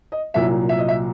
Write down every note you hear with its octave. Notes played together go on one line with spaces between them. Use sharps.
D#5
C2 A#2 F#3 E5
E5
D#5
E5